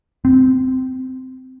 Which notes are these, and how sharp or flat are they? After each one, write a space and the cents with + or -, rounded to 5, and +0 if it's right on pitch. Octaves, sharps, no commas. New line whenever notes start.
C4 -15